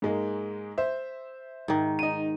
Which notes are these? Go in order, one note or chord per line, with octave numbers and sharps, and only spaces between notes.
G#2 G#3 A#3
C5 E5
G#2 D#3
D#4 D#7